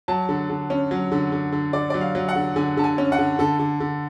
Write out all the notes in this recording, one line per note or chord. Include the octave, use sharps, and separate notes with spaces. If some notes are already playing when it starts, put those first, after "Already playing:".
F#3 A5
D3
D3
C#4
F#3
D3
D3
D3
D3 D5
F#3 D5
F5
F#3
F#5
D3
D3 G#5
D3 A5
G#5
C#4
F#5
D3
D3 A4
D3
D3